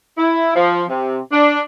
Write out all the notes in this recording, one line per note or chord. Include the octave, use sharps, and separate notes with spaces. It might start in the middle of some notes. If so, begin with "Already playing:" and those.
E4
F3
C3
D4